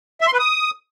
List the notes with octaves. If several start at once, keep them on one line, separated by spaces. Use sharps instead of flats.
E5
C6
B4
D#6